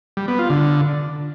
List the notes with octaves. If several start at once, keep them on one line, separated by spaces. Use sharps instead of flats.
G3
B3
F4
D3